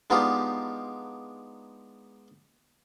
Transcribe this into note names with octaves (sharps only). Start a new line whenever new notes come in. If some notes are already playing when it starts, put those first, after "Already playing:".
G#3 B3 D4 D#4 F4 G4